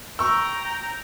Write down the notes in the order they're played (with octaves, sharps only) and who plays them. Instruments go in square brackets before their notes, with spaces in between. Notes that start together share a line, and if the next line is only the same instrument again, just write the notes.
[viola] G5 A#5 [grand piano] C#6 E6